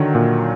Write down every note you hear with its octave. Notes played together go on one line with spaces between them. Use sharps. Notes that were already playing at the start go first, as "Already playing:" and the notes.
Already playing: D3 D#3 F#3
A#2